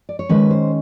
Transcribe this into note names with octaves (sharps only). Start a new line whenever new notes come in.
D5
C#5
D#3 G#3 C#4 B4
C5